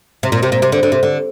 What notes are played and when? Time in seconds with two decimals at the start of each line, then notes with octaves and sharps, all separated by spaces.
0.23 C3
0.32 A#2
0.43 C3
0.52 A#2
0.62 C3
0.72 D3
0.83 D3
0.92 C3
1.03 D3